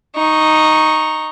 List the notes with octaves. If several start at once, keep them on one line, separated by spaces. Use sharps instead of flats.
D#4 C#6